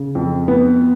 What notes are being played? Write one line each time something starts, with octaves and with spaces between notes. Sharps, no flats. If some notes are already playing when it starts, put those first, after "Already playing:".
Already playing: C#3
F2
B3